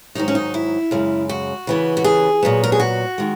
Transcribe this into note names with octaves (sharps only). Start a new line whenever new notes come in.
G#2 D#3 F#3 D#4
C#4
D#4
E4
F#2 C#3 G#3
F#4
C#3 E3 B3
F#4
G#4
A#2 F#3 B3
A#4
G#4
F#4
D#3 G#3